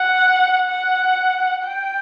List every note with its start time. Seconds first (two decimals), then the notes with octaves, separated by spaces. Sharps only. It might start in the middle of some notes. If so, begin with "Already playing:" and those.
Already playing: F#5
0.69 F#5
1.64 G5